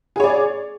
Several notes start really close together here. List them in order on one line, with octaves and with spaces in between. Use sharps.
G#4 C#5 D5